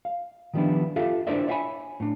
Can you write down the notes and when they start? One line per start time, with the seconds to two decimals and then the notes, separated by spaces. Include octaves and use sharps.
0.05 F5
0.54 D#3 F3 G3 B3 D4 E4
0.96 F4 G4 A4 E5 F5
1.27 D4 E4 A#4 C5 D5 E5
1.47 C#5 D5 E5 F5 G#5 B5
2.00 A2 D4